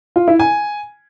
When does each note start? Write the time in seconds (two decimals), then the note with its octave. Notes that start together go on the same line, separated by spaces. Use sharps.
0.16 F4
0.28 E4
0.39 G#5